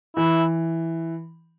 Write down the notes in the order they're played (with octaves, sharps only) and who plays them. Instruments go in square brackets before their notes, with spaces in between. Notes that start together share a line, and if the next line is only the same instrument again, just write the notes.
[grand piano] E3 [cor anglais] E4